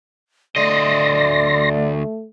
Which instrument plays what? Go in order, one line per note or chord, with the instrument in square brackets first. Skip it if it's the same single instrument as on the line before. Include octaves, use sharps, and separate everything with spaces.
[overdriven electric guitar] D2 D#5 [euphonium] A3 [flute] D5 [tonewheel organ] C6 A#6